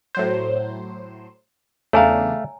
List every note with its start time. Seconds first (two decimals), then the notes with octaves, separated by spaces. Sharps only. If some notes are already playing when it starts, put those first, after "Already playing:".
0.15 A2 F#3 C5
1.93 E2 C#3 A3 D4 C#5 F5 G#5 A#5